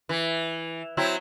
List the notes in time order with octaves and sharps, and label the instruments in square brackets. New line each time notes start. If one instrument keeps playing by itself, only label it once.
[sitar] E3
F#3 C4 E4